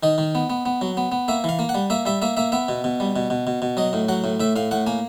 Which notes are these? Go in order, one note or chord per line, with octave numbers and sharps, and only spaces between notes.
D#3 D#5
D#3
B3
B3
B3
F#3
B3
B3
A#3 E5
E3 F5
A#3
F#5
G3
A#3 E5
G3 E5
A#3 E5
A#3 E5
B3 E5
B2
B2
G3
B2
B2
B2
B2
F#3 D#5
A2
F#3 F#5
A2
A2 E5
A2 F5
A2 F#5
A#3 G#5